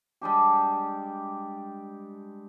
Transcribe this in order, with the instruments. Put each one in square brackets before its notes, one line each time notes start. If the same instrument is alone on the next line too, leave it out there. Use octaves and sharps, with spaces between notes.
[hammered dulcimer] G3 G#3 D4 G4